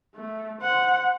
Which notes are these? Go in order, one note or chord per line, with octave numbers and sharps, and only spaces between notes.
A3
C5 F#5